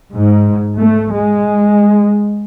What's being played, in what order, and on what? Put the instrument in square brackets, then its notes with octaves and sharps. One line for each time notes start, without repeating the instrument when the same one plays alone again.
[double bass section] G#2
A3
G#3